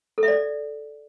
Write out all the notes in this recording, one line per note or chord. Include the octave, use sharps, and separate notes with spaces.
A4
E5
D5